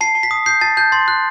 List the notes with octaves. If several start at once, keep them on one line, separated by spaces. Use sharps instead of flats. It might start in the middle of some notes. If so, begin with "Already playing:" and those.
A5 C7
A5
B6
D#6
G6 C7
A5 A6
A5 G6
C6 A6
F#6